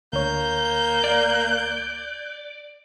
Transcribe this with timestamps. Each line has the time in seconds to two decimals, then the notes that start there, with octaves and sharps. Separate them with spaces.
0.13 D2 A#3 C#5 G6
1.04 D5